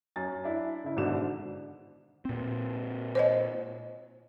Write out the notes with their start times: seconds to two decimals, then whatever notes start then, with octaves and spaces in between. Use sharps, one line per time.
0.16 F#2 G#5 A6
0.44 D4 E4
0.84 C#3 E4
0.97 G#1 G#2 B2 D3 E7
2.25 A#2 C4
3.15 C5 C#5 D#5